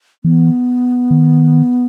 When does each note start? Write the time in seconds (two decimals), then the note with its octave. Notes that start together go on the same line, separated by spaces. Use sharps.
0.24 E3 B3
1.11 D#3